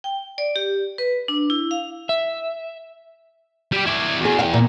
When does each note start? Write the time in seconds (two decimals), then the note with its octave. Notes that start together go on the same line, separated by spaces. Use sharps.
0.04 G5
0.38 D5
0.56 G4
0.98 B4
1.28 D4
1.50 E4
1.71 F5
2.09 E5
3.72 G3 G4
3.87 E4 D5
4.21 E2 F#4 G#4
4.39 F5 G5
4.53 A#2